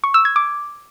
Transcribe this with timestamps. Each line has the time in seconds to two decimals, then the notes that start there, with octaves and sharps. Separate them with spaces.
0.04 C#6
0.14 E6
0.25 G#6
0.36 D6